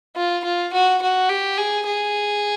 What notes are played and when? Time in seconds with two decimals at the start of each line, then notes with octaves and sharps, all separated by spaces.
0.16 F4
0.45 F4
0.73 F#4
1.02 F#4
1.29 G4
1.58 G#4
1.87 G#4